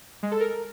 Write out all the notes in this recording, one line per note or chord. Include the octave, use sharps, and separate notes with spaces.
G#3
A4
A#4